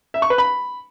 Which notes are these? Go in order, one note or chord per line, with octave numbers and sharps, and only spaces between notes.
E5
C#6
B4
B5